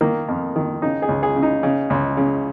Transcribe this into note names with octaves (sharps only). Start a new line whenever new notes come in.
D#3 A#3
F2
D#3
C#3 D#4
G#4
C#2
G#4
C#3
D#4
C#3
C#2
C#3